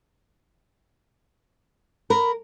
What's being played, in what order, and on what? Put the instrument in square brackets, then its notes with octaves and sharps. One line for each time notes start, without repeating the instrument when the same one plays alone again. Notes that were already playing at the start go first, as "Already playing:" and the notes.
[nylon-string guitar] A#4 [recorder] B5